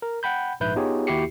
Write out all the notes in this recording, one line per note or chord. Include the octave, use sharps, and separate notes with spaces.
A#4
F#5 G5 B5 G6
A#1 G#2 B4 E5 G6
B3 D#4 F4 G4 G#4 C#5
D#2 E4 F#4 G4 C7 C#7